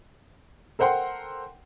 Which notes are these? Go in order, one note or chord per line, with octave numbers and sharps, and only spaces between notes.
A4 A#4 C5 F#5 G5 C6